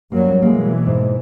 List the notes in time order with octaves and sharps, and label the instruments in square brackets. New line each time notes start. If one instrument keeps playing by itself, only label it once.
[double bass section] F#2 F#3 G3 [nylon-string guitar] A#3
[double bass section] B2 E3 [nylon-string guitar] G#3 A#3
[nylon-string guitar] G#2